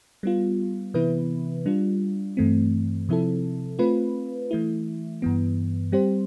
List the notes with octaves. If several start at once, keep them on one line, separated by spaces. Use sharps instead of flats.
G3 B3 F4
C3 E3 B3 E4 B4
G3 D4 F4
G2 E3 A3 C4
C3 F3 C4 E4 A4
A3 C4 F4 B4
E3 A3 E4
G2 E3 B3
G3 C4 G4 C5